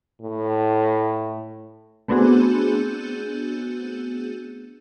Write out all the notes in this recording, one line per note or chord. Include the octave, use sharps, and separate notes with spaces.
A2
A3 B3 C4 D4 F#4 G#4